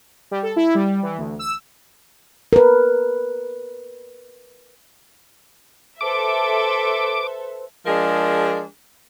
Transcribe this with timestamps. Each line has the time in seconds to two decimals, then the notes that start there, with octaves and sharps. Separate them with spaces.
0.31 G3
0.43 A4
0.56 E4
0.75 G3
1.03 E3
1.18 D2
1.39 E6
2.53 A#4 B4
6.01 A4 B4 C5 E5 D6
7.86 F3 G#3 D4 G#4 A#4